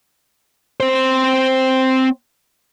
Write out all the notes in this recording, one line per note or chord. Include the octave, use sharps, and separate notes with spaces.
C4 C5